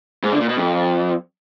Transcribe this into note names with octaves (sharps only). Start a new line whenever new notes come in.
G#2
D3
A#2
B2
F2